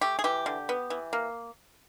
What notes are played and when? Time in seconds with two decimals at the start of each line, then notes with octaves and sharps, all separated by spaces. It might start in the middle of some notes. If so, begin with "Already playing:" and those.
0.01 A3 G4
0.19 G#4
0.24 E3 G4
0.46 D3
0.69 B3
0.90 E3
1.13 A#3